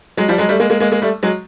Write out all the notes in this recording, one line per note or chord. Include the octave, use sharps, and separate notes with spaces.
F#3 G#3
F3 G3
F#3 G#3
G3 A3
G#3 A#3
G#3 A#3
G#3 A#3
G#3 A#3
G3 A3
F#3 G#3